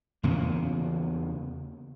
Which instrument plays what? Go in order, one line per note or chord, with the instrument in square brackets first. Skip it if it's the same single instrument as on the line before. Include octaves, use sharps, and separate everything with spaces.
[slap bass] E2 C#3 A#3 B3